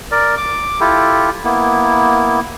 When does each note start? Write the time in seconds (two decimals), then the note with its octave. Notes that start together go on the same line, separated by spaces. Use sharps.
0.11 A#4 D5
0.37 D6
0.80 E4 F4 G4 A4
1.44 A#3 B3 E4